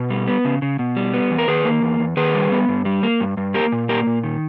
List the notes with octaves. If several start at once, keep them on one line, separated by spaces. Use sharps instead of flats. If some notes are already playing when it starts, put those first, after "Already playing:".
Already playing: B2
G3
B3
C#3
C#3
B2
G3
B3
E2
A#4
D#3 G#4 B4
A#3
E2
E2
D#3 G#4 B4
G3
B3
G2
G3
A#3
G2
G2
A#3 G4 A#4
A#2
A#3 G4 A#4
A#2
D#3